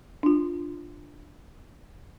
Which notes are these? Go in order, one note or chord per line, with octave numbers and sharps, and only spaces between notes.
D4 F4